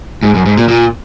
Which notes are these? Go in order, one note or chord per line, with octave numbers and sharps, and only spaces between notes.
G#2
F#2
G#2
A#2
A#2